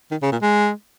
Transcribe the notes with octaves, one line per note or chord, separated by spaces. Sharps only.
D#3
C#3
A#2
G#3